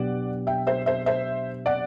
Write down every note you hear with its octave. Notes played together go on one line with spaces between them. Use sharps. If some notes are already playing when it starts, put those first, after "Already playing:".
Already playing: B2 F#3 B3 D4 G4 D5 F#5
E5 G5
C5 E5
C5 E5
C5 E5
D5 F#5